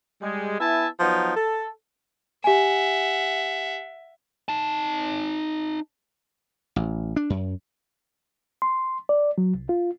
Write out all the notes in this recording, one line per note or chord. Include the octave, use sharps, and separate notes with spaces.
G3 G#3
B3 E4 E5 G#5 A5
F3 F#3 B3 D#4
A4
G4 E5 F#5 G#5
D#4 A5
A1
D4
F#2
C6
D5
F#3
C2
F4